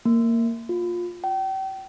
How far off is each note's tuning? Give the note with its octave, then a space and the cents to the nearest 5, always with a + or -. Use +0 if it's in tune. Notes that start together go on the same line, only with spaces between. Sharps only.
A#3 -15
F4 +20
G5 -35